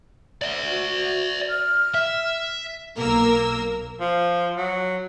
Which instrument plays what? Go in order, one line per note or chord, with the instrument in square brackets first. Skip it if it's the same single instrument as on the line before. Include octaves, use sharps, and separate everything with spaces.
[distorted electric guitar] D5 E5
[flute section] F#4
F6
[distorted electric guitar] E5
[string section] B1 A#3 A#4 E6
[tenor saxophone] F3
F#3